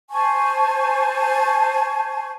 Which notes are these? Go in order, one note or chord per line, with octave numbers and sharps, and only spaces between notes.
C5 G#5 A5 C#6